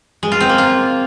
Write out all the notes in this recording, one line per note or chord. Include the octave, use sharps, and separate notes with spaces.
G#3
F4
C4
A#3
F4